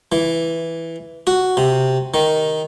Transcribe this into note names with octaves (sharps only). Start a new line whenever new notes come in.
E3
F#4
C3
D#3